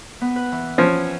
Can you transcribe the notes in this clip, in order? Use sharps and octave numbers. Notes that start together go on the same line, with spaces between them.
B3
B4
E3
F3 C#4